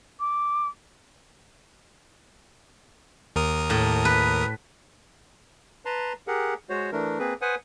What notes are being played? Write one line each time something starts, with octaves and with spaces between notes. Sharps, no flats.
D6
D#2 A#4 D#6
A2
B4
B4 A5 A#5 C6
G4 G#4 A#4 F#5
G#3 F#4 C5 C#5
E3 A3 D4 A#4
A#3 C4 G#4 B4
B4 C5 F#5 G#5 D#6